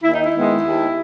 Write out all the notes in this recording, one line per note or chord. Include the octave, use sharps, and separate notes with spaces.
D#2 E4
D#4
E4
D#3 G#3 B3
D#2